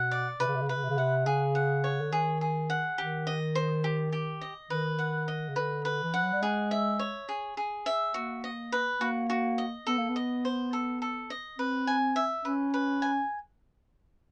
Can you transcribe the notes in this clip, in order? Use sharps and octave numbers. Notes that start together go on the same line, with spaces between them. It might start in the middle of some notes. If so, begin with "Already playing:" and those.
Already playing: B2 F#5
D5
C3 B4
C#3
C3
C#3
C3 B4
C#3
C3
C#3
C3 F#5
C#3 G#4
F#5
C#5
D3
D#3 G#4
G#4
F#5
D#3 G4
D#5
C5
G4
G4
D#5
D#3 B4
F#5
D#5
C#3
D3 B4
B4
E3
F3 F#5
F#3
G3
G#3 G#4
E5
C#5
G#4
G#4
E5
A#3 F#4
D#5
B4
A#3 F#4
F#4
D#5
B3 A4
A#3
B3
D#5
C5
A4
A4
D#5
C4 B4
G#5
E5
C#4 B4
B4
G#5